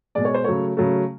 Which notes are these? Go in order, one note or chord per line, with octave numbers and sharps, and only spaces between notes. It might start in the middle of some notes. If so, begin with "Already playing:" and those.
B2 G#3 D5
C#5
C5
C#3 F#3 A3 C#5
C#3 F#3 A3